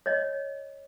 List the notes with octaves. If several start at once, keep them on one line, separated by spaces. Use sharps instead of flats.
C#5 D#5